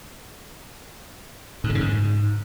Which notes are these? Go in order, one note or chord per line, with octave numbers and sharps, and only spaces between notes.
G#2
D3
C#3
G#2